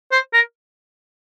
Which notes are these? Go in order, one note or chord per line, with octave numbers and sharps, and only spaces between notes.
C5
A#4